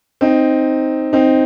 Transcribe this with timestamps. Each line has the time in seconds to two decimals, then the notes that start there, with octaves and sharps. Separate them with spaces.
0.21 C4 D#4
1.13 C4 D#4